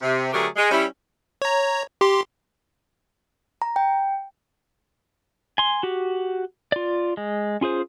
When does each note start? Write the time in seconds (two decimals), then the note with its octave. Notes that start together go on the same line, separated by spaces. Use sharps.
0.02 C3
0.33 D3 F#3 A3 G4 G#4 A#4
0.56 G#3
0.71 G3 C#4 E4
1.42 C#5 A#5
2.01 G4 C6
3.62 A#5
3.76 G5
5.58 G#5 C6
5.83 F#4 G4
6.72 F4 D5
7.17 G#3
7.61 C#4 F4 G#4 C5